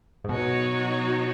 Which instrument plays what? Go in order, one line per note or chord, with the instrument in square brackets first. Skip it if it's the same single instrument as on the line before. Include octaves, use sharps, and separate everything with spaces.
[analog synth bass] G#2
[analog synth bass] B2 [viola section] F#3 D#4 F#4 C#5